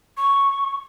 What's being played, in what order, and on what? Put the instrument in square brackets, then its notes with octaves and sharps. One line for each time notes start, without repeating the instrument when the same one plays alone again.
[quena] C#6